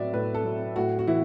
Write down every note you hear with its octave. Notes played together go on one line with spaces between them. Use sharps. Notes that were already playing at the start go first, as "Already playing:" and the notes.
Already playing: A2 F#3 B4 D5 E5
A2 B4
A4
F#3
A2 F#4
F#4
E3 E4